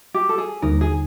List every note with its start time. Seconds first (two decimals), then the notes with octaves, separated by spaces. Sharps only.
0.14 G4
0.29 A4
0.38 G#4
0.62 D#2 D3 G3 A#3 D#4 A#4
0.81 G#4